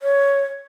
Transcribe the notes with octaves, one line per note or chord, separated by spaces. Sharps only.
C#5